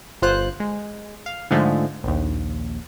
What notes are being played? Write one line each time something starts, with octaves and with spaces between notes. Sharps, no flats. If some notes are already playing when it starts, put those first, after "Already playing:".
G1 F4 C5 F#6
G#3
F5
G#2 D3 F3 G#3 A3
A#1 D#2